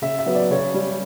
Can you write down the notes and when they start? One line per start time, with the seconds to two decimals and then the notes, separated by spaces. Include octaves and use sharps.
0.02 C#3 E5
0.19 E5
0.26 F#3 B3
0.35 D5
0.50 C#3 C#5
0.74 G3 C#4